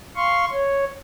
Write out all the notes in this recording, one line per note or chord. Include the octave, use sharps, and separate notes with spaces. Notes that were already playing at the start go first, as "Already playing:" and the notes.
F5 C6 C#6
C#5